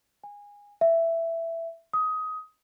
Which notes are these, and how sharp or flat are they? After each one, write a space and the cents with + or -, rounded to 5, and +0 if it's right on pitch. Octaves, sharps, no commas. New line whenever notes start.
G#5 -20
E5 +10
D#6 +20